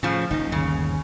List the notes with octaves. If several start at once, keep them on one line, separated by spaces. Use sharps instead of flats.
A2 C#3 F3
F#1 C#3 D#4
G1 D#2 C#3